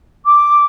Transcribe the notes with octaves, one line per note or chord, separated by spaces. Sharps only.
D6